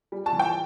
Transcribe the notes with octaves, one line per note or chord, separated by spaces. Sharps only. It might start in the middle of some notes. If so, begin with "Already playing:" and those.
G3
A5
E3
G5